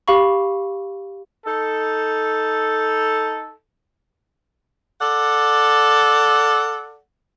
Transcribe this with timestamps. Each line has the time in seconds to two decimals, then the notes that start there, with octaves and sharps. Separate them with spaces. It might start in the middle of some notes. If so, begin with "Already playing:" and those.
0.08 G4 F5 B5 C#6
1.46 D#4 A4
5.01 A4 D5 F#5